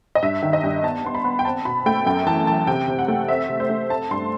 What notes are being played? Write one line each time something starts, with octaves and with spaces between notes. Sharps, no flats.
D#5
G2 E5
D#3
D#5
G2
B3 A5
B3 C6
B5
B3
G5
C4 A5
B2 B5
A3 G5
F#2 G5
E3 A5
E3 A5
C3 G5
C3
F#5
A3
C4 E5
C3
C5
A3
C4 A5
G2 C6